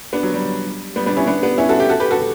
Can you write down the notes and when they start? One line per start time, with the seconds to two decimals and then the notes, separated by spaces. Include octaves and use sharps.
0.13 B3 D4
0.23 F#3
0.34 G3
0.96 G3 B3
1.06 B3 D4
1.17 C#4 E4
1.27 B3 D4
1.43 B3 D4
1.58 C#4 E4
1.69 F#4 A4
1.79 E4 G4
1.89 F#4 A4
2.00 G4 B4
2.11 F#4 A4